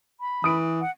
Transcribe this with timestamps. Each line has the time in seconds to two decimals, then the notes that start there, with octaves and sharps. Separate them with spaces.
0.21 B5
0.44 E3 D#6 D7
0.81 F#5